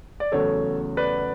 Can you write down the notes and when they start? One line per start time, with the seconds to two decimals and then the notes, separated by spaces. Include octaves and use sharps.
0.20 D5
0.32 E2 C#3 F#3 A3 A4 C#5
0.97 B4 D5